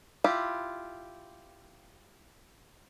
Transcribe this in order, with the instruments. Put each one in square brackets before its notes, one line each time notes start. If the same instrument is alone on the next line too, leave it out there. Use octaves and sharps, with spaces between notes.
[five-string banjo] E4 F4 G4